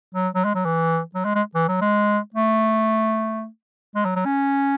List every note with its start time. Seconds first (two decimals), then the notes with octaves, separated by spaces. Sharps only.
0.14 F#3
0.34 F#3
0.45 G#3
0.55 F#3
0.65 E3
1.15 F#3
1.25 G#3
1.35 G#3
1.55 E3
1.68 F#3
1.81 G#3
2.34 A3
3.96 G#3
4.05 F#3
4.16 F#3
4.25 C#4